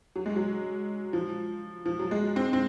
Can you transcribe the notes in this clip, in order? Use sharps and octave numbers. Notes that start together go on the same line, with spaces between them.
F#3
G#3
F#3
F3
F3
F#3
G#3
C4
C4